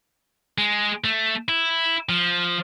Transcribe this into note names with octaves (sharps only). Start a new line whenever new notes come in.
G#3
A3
E4
F3